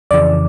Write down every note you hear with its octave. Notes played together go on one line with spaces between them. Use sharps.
F2 C#3 E3 D5